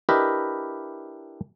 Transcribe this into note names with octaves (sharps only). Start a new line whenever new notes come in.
D4 E4 G4 A#4 B4 D#5